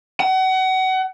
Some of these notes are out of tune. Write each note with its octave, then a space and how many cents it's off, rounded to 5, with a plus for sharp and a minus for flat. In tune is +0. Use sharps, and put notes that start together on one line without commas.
F#5 +30